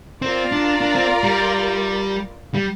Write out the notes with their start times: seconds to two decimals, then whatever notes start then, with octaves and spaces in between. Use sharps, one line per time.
0.22 C4 F4 A#4 D5
0.52 D4
0.81 D4
0.95 C4
1.24 G3
2.55 G3